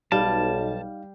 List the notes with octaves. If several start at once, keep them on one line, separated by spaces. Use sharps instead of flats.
B1 G3 D#4 F5 A5